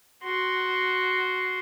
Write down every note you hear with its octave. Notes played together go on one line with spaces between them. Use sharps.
F#4 C6